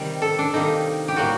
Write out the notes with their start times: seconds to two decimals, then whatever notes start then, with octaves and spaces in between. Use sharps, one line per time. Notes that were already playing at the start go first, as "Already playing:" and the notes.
Already playing: C3 D#3 G3
0.22 A4
0.39 D4
0.53 C3 D#3 G3 A#3 D#4
1.08 G4
1.16 A2 G3 A#3 F#4